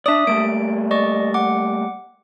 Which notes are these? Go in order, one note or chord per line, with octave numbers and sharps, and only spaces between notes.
D4 D5 E5 D#6
G3 A3 A#3 D7
D5 D#5 C#6
F#5 D6